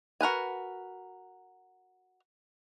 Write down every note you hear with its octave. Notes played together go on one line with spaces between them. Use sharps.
F#4 A#4 B4 G#5